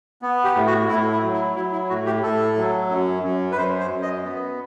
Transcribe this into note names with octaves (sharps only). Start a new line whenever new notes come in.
B3
G4
A2
F#4
A2 E4
E4
F#3
E4
F#3 E4
E4
A2 F#4
G4
A2 A4
F#3
F#2
F#2
B4
F#2 C5
C5
F#2
D#5
B3